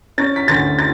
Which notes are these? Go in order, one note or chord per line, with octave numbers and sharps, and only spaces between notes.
C#4 A6
B6
D2 A6
A6